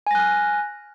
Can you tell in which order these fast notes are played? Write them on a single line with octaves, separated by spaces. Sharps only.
G#5 A#6 F#6 F6